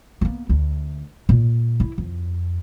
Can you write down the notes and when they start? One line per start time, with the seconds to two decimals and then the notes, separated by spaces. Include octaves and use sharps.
0.21 A#3 B3
0.49 D2
1.29 A#2
1.80 E4
1.98 F2